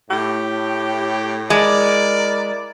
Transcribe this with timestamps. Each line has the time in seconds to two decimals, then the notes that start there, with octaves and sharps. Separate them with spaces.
0.11 A2 G4
1.50 G#3 E4 A#4 D5